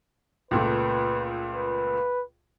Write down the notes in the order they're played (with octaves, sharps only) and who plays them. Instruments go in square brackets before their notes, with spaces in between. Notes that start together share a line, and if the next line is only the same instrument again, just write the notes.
[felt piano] C#2 A#2 A3 [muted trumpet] B4
[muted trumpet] B4